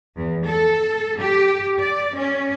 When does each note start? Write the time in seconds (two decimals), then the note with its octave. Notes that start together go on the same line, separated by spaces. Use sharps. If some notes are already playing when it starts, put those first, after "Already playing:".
0.17 E2
0.47 A4
1.19 G4
1.79 D5
2.16 C#4